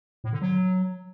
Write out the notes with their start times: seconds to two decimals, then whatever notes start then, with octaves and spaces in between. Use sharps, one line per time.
0.24 A2
0.33 D3
0.42 F#3